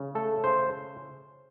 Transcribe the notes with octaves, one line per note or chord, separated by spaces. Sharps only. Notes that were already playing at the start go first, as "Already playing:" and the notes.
Already playing: C#3
A3 A4
C#3 C5